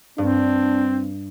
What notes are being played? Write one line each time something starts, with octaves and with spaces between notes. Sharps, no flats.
G2 C4 D4